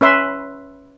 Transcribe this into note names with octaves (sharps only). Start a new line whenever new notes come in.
C#4 B4 E5 C6